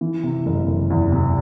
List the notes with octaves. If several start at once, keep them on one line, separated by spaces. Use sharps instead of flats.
E3
C3
F#1
F#1
E2
C3